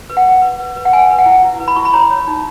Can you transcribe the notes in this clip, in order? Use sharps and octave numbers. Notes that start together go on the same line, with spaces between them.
B4
F#5
B4
B4
B4
B4
F#5
B4 G#5
B4
F#5
E4
E4
B4
B5
E4 C#6
B5
C#5 A#5
C#5
D#4